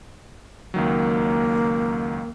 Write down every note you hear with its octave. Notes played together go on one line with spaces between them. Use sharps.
C#2 D#3 F#3 A#3